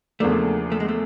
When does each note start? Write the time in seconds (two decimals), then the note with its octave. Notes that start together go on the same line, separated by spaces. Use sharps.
0.20 E2 C#3 F3 A3 A#3 D4
0.72 A3
0.80 G#3
0.88 A3